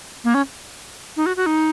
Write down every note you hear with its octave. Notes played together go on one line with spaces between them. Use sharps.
A#3
C#4
D#4
F#4
F#4
D#4